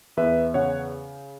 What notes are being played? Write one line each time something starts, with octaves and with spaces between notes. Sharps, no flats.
E2 B4 E5
C#3 C#5 F#5